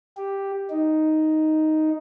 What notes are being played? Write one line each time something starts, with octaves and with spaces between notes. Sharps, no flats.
G4
D#4